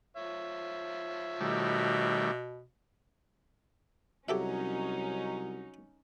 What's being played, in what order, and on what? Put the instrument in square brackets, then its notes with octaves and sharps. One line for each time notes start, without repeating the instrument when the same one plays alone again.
[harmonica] F3 C#5 E5
[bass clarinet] B2 [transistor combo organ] D#3 G3 A3
[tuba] C2 [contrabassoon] F#3 [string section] C#4 D#4 [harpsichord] G4 A4 E5